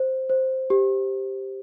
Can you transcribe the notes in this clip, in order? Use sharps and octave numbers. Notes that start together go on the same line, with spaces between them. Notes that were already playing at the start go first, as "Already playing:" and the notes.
Already playing: C5
C5
G4